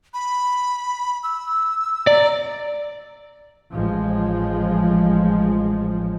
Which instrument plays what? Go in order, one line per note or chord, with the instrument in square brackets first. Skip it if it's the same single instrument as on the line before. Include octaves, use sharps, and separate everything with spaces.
[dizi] B5
E6
[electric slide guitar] D5 [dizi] A#5
[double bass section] A1 F3 G#3